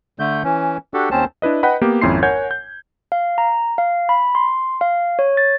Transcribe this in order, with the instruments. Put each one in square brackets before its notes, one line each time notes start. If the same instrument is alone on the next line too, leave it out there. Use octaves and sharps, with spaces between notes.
[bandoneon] D3 A3 G6
E3 C#4
D4 F#4 G4 A4
D#2 C4 C#4 C5 A5
[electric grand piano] D4 E4 B4 D#5
B4 D#5 F#5 G5 B5
A#3 B3 G4
G#1 F2 C#4 E4 C6 C7
A#4 C#5 F#5 G#5 G6 G#6
G6
[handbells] F5
A#5
F5
B5
C6
F5
C#5
A6